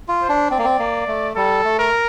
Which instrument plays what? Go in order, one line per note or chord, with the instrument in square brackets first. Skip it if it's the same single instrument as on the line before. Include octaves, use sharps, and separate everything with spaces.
[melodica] F4
[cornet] C5
[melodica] D4
[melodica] C4 [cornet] D5
[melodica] A#3
C4
A#3
A3
[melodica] G3 [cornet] A4
[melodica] A3
[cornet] A#4